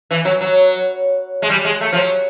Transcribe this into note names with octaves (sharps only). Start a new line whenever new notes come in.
E3
F#3
F#3
G#3
G3
G#3
A3
F3
F#3